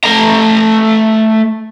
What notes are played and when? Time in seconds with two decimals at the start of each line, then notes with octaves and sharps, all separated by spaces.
0.04 A3 A#5